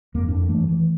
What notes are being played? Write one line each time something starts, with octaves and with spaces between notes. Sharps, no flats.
F#1 F2 A#3
F2 D4
G2 E3 A3
E3